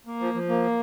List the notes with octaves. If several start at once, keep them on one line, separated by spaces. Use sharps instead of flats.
A#3
F3
F3
A#3